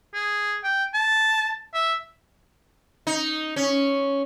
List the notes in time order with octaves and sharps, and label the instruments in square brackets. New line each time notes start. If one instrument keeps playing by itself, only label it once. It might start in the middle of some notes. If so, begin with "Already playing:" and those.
[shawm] G#4
G5
A5
E5
[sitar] D#4
C#4